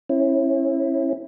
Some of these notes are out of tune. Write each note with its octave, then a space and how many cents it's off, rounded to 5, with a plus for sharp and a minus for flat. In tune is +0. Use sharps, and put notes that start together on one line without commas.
C#4 -35 E4 +0